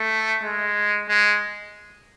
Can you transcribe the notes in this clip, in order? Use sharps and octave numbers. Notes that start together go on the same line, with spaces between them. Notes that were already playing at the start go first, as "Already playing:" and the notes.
Already playing: A3
G#3
G#3